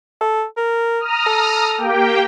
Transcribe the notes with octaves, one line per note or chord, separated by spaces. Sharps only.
A4
A#4
A#5 D#6 F6
A4
A#3 G4 G5